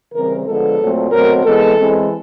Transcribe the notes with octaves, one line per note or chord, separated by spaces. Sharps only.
C#3 E3 G3 C4 A#4
D3 F3 G#3 B3 A4
A#2 F#3 A3 C4
B2 F#3 A3 C4 A#4
E3 G#3 B3 A4
E3 G#3 C4